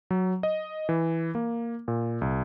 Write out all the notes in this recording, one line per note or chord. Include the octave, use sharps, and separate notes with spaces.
F#3
D#5
E3
A#3
A#2
C2